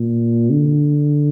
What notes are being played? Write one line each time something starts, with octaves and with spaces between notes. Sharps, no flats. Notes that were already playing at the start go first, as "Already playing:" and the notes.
Already playing: A#2
D3